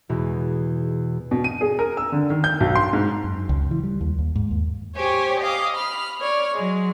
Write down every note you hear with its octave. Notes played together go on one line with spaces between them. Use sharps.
E2 B2 G#3
B2
D#7
G#4
A#4
E6
D3
D#3
G6
B1
C6
G#2
F#2
C#2
E3
G3
D#2
D#2
G#2
D#2
G4 C5 C#5 G#5
D#5 F5 D6
B5 F6
C#5 D5 F6
F#3 G#3